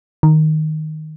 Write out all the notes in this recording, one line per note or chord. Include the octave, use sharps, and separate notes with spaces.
D#3